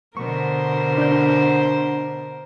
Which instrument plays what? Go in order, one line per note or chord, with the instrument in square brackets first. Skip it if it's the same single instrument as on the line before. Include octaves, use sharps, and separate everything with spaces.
[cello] B2 D3 [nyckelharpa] A#4 C5 [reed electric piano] C#6
[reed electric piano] D4 G6